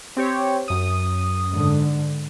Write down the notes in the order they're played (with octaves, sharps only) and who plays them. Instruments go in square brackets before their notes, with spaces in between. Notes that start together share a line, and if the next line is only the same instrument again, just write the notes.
[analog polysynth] C4 G4 C#5
F#2 D#6
[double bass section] G#2 D3